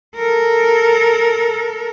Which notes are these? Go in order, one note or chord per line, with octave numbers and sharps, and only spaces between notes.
A4 A#4